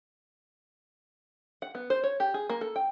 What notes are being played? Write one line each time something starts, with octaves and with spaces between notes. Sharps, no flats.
F#5
B3
C5
C#5
G4
G#4
A#3
A4
G5